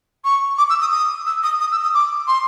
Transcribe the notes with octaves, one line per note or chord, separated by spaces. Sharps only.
C#6
D6
E6
D#6
D#6
E6
D#6
D#6
E6
D#6
D6
C6